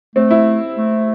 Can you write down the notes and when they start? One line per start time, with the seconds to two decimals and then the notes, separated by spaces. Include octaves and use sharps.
0.15 A3 C4
0.31 E4
0.77 A3